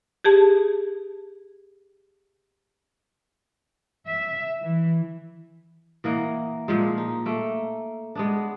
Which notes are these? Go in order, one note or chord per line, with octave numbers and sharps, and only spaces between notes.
G4 G#4 A5
E5
E3
E3 A#3 D#5 F#5
A#2 F3 G#3
D#4
A3 A#3
G#3 B3 D4